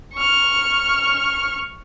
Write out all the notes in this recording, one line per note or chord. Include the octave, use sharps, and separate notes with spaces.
C#6 F6